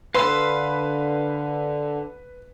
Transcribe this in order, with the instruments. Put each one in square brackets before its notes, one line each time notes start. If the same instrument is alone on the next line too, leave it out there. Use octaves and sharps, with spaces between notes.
[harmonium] D3 [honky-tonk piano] B4 [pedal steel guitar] F5 C6 E6